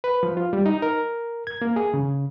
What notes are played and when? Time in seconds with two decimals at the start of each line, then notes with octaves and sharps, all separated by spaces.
0.04 B4
0.23 F3
0.37 F4
0.53 G3
0.66 D#4
0.82 A#4
1.47 G#6
1.62 A#3
1.76 G#4
1.94 C#3